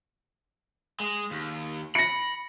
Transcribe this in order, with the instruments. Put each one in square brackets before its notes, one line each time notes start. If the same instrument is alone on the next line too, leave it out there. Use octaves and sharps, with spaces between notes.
[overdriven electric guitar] G#3
D#2
[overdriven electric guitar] B5 [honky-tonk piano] A#6 C#7